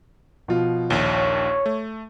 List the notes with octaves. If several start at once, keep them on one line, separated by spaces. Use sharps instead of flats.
B2 F3 F4
A#1 D#2 C#5 G7
A3